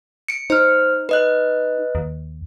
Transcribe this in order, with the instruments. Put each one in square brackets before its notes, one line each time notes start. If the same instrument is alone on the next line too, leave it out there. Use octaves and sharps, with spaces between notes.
[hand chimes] C#7 D7
[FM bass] D#4 [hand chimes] C5 F6
[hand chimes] B4 D#5 F#6
[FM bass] D#2